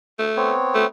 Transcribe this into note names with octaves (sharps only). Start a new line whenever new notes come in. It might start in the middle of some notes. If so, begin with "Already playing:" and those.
A3
B3 C4 C#5
A3